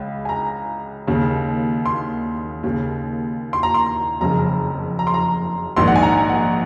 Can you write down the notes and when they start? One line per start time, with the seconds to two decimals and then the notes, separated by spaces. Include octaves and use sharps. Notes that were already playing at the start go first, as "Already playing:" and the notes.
Already playing: C#2 C#3
0.25 G#5
0.29 A#5
1.07 D#2 C#3
1.86 C6
2.63 D#2 C#3
3.53 C6
3.63 A#5
3.74 C6
4.21 F#1 F2 C#3 A#5
4.99 A#5
5.07 C6
5.14 A#5
5.76 A#1 G#2 D#3 C6
5.88 F#5
5.96 G#5
6.03 A#5
6.29 F#5